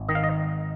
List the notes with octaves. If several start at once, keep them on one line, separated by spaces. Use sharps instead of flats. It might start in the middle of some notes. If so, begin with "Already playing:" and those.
Already playing: G#1
D#3 D#5
F5
D#5